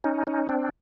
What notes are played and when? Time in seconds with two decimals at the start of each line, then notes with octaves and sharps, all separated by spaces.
0.04 C#4 D#4
0.27 C#4 D#4
0.49 C4 D4